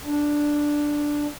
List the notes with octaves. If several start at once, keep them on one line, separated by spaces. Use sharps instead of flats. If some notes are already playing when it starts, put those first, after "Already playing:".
D4